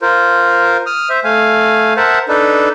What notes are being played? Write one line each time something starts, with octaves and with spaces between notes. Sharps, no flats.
F4 A#4 C5
D#6 F6
C5 E5
A3 F5 G#5
A#4 C5 E5 F#5 A5
D4 D#4 A4 B4